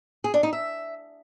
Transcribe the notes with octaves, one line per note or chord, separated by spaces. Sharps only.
G#4
D4
D#4
E5